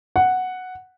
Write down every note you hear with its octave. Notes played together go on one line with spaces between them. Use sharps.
F#5